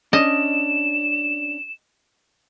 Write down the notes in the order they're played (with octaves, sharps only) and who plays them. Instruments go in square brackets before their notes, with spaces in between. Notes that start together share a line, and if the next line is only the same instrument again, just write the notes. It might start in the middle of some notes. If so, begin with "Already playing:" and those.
[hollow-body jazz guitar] C#4 D4 [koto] D#5 [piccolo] E7